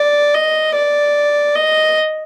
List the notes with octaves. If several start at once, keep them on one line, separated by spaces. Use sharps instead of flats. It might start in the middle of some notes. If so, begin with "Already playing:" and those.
Already playing: D5
D#5
D5
D#5